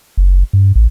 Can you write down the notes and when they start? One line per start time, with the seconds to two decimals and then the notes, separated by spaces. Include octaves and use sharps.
0.17 F#1
0.53 G2
0.75 A1